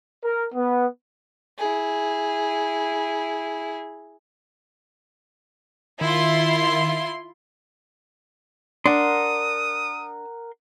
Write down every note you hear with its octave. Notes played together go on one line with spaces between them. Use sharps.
A#4
B3
E4 G#4
D#3 E4 F4 C6
D4 A#4 F#5 C6 D#6